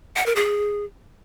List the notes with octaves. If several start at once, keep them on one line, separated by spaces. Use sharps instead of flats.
F#5
A#4
G#4